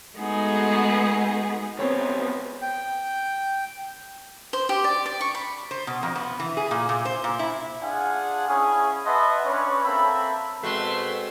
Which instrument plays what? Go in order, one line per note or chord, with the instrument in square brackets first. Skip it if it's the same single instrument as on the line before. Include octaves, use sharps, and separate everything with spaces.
[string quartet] G#3 A3 B3 D#4 F#4 G#4
[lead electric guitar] C#2 B3 [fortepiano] C4 C#5
[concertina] G5
[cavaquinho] C5
G4
D5
D5
C#6
B5
[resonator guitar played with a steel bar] C5
B2
F2
B3
E3
G#4
A#2
A#2
C5
A#2
E4
[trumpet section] D4 F4 G#4 F5 F#5 G#5
C#4 E4 G#4
B4 D#5 E5 F#5 A5 C6
C#4 D4 B4 C#5
A#3 C4 A4 E5 B5
[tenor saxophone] B2 [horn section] G#3 C4 [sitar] A3 [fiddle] C6